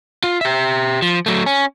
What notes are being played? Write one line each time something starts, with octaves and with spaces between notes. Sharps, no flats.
F4
G4 E5
F3
F#3 A3
C#4